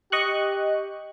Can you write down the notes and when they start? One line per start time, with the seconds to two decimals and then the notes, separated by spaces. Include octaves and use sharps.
0.12 G4 D#5 C#6 F#6